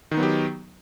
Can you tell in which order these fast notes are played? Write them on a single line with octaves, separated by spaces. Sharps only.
D#3 D#4 B3 F#3 G4